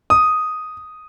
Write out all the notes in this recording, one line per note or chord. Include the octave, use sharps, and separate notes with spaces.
D#6